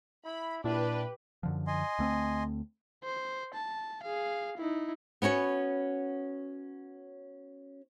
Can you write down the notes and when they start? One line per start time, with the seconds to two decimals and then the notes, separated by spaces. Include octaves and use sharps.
0.25 E4 B5
0.64 A#2 D4 E4 G4 B4
1.43 F#2 D3 F3
1.67 D#5 G#5 C6
1.99 D2 A3 C4
3.04 C5
3.54 A5
4.03 G#4 F5
4.57 D#4 E4
5.22 B3 C#4 F#4 C#5